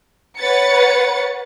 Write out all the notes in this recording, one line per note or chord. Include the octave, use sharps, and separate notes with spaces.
B4 C#5 F#5 A6 C#7